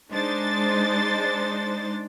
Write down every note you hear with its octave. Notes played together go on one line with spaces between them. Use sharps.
G#3 D4 D#4 C5 A6